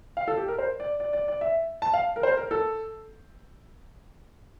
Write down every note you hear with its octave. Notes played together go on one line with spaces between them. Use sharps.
F5
A4
G4
A#4
C5
D5
D5
D5
D5
E5
A5
F5
A#4
C5
A#4
A4